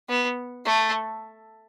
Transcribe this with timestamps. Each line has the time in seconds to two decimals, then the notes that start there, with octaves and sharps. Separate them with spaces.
0.09 B3
0.66 A3